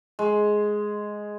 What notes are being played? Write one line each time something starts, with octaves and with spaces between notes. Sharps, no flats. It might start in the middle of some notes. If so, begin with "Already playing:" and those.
G#3